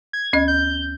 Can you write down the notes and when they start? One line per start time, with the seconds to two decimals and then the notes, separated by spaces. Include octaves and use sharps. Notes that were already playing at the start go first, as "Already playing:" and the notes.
0.13 G#6
0.33 D2 C#4 D#5
0.48 G6